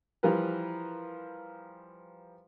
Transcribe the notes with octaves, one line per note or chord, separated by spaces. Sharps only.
E3 F3 G3 A#4 B4